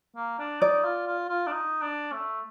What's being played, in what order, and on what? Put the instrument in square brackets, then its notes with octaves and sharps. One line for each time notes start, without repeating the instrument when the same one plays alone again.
[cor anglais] A#3
D4
[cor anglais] D#4 [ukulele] D5
[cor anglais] F4
F4
F4
D4
D#4
D4
A3